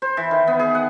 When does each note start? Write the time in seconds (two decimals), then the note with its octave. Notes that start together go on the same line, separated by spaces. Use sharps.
0.02 C5
0.17 E3
0.31 D#3
0.47 B3
0.59 G#4
0.75 F#5